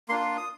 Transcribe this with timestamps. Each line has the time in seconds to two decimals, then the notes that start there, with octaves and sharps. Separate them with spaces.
0.09 A#3 D4 F4 C6
0.37 D#6